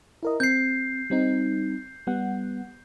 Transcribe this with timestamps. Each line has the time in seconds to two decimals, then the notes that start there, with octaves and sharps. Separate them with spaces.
0.23 E4 A#4 D#5
0.40 C4 G6 C7
1.10 G3 C4 D#4
2.07 G3 B3 F#5